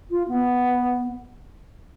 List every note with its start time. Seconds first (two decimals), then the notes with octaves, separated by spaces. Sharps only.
0.10 F4
0.28 B3